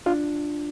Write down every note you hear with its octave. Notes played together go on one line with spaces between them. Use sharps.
D4 F4